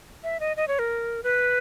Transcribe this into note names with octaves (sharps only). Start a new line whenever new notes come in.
E5
D#5
D#5
C#5
A#4
B4